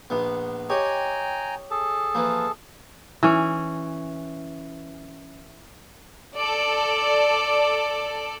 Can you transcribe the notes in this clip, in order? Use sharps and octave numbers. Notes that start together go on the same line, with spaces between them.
A#1 B3
G4 C#5 D#5 G5 G#5 A#5
G#4 A4 A5
E3 F3 A#3
E3 C#4
A4 D5